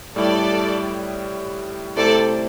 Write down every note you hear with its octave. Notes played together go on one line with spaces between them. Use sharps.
A2 G3 E4 G4 A4 D5
C3 A3 E4 A4 C5 D5